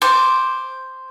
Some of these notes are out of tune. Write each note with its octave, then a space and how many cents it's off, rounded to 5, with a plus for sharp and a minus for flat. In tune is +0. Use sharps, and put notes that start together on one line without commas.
C5 +0 D6 +0